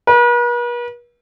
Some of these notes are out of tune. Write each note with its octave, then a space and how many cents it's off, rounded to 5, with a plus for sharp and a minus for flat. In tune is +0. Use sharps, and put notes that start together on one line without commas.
B4 -45